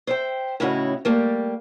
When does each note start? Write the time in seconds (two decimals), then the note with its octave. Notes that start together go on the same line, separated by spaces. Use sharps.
0.07 C5 E5 G5
0.60 A2 C#3 C#4 D#4 E4 F#4
1.05 G3 A3 A#3 G4